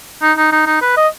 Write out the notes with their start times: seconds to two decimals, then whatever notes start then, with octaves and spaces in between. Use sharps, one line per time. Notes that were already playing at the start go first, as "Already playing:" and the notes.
0.22 D#4
0.38 D#4
0.52 D#4
0.67 D#4
0.82 B4
0.97 D#5